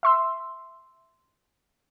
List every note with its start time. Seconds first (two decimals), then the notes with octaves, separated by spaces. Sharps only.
0.03 E5 C6 E6